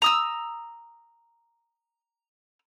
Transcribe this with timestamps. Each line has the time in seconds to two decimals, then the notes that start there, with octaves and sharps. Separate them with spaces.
0.02 A#5 D#6 E6